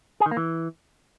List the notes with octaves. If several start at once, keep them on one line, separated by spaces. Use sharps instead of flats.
G#4
D#3
A#3
E3